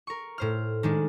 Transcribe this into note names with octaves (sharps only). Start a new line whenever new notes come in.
A#4 C#6
A2 C5 F6
D#3 G#3 D4